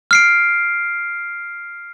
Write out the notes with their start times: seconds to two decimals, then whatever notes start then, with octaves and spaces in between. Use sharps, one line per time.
0.11 F6 C7 D7